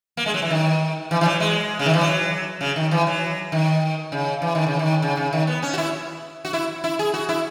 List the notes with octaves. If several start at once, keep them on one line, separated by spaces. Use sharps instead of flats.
A#3
G#3
F#3
E3
D#3
E3
E3
F#3
G#3
C#3
D#3
E3
F#3
C#3
D#3
E3
F#3
D#3
C#3
E3
D#3
C#3
D#3
C#3
C#3
D#3
B3
C#4
F#4
E4
F#4
E4
E4
G#4
F#4
E4